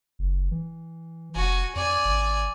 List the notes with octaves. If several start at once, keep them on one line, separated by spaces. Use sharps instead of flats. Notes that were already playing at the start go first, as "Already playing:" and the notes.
F#1
E3
F1 F#4 G#5
F2 D5 G#5
G#1